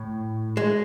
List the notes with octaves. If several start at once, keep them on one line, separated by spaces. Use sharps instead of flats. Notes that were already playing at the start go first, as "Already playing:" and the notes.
Already playing: A2
G#3